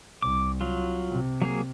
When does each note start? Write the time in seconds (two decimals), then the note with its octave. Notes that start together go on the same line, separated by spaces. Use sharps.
0.22 C2 D6
0.61 F#3 F4
1.10 C3
1.42 F#3 A#3 G#4